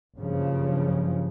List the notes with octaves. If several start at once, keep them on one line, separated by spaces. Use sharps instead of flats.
F#1 G2 C#3 F3